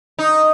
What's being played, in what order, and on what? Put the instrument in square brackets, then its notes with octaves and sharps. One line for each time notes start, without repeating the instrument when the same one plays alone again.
[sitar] D#4